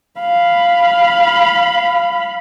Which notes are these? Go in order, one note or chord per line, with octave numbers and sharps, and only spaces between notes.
F5 B5